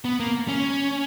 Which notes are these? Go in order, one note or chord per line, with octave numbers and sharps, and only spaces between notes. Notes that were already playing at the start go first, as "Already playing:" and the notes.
B3
A#3
C#4